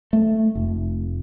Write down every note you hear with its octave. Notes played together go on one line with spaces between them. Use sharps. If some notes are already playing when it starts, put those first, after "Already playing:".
A3
F1